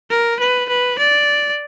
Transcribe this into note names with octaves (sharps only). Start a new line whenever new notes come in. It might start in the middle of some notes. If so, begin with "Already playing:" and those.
A#4
B4
B4
D5